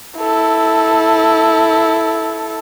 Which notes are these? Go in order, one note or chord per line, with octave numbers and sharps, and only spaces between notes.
E4 A4